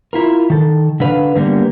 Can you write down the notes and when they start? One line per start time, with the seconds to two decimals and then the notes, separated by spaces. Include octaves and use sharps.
0.13 E4 F4 A#4
0.50 D#3 A4
1.00 D3 D4 B4 F5
1.36 D3 G3 A#3 B3